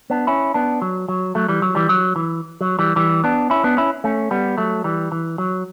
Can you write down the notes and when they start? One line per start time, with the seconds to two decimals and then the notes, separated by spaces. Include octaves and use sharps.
0.10 B3 D4
0.27 C#4 E4
0.54 B3 D4
0.82 F#3
1.09 F#3
1.35 F#3 A3
1.49 E3 G3
1.62 F#3
1.75 E3 G3
1.89 F#3
2.16 E3
2.61 F#3
2.79 E3 G3
2.96 E3 G3
3.24 B3 D4
3.50 C#4 E4
3.64 B3 D4
3.77 C#4 E4
4.04 A3 C#4
4.31 G3 B3
4.58 F#3 A3
4.84 E3 G3
5.12 E3
5.38 F#3